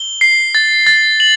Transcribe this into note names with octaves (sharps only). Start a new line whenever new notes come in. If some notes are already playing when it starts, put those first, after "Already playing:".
Already playing: G7
C7
A6
A6
F#7